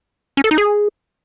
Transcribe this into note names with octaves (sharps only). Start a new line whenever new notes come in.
C#4
A4
D#4
G#4